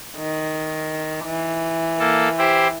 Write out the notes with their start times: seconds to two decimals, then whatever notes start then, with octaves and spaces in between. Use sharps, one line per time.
0.17 D#3
1.25 E3
1.99 A#3 A4
2.38 E4 G4 C5